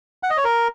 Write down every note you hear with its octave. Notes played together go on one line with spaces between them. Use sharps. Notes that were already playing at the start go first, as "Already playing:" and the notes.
F#5
D#5
C#5
A#4